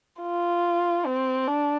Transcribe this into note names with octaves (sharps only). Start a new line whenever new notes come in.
F4
C4
D4